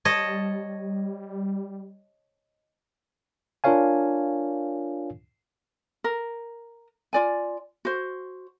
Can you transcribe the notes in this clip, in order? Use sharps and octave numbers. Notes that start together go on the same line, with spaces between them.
G3 C#5 D#5 A5
D4 F4 A#4 C#5 F5 G#5
A#4
F4 D5 G#5
F#4 C5